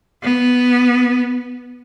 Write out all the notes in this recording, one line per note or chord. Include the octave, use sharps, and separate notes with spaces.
B3